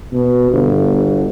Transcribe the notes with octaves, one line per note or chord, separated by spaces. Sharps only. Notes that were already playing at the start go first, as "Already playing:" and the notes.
B2
G1